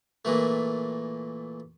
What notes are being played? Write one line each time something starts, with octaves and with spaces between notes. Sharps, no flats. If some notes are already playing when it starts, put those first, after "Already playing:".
A#2 E3 A3